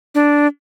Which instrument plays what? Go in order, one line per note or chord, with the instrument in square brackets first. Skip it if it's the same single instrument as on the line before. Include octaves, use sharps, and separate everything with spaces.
[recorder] D4